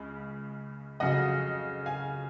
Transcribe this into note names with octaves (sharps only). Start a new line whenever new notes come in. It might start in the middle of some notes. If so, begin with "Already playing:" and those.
Already playing: C#2 C#3
F2 C#3 F#3 D#5 F#5
F5 G#5